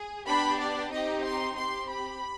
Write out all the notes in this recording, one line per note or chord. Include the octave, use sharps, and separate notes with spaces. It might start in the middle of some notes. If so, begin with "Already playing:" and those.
Already playing: G#4
B3 D4 G4 B5
D5
C4 D#4 G4 D#5
C6
C4 G4 C6
B5